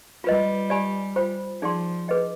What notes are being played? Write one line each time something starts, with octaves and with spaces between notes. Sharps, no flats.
G3 F4 B4 D#5
G4 D5 G#5 B5
F4 C5 G5 B5
F3 D#4 G#4 D5 G5 C6
G#4 B4 D#5 G5